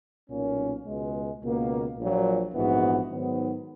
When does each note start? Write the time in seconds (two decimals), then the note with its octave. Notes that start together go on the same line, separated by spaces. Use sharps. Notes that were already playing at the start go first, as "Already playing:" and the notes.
0.29 B1 A#2 A#3 C#4
0.84 C#2 B2 G#3
1.41 C#2 B2 A#3
1.97 A#1 A#2 F#3
2.54 A#1 G#2 E3 B3 F#4
3.09 G#2 D#3 F#3 B3